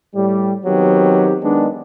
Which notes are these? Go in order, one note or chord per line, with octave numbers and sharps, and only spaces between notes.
A2 G3
D#3 F#3 B3 C4 G4
D#3 G#3 B3 D4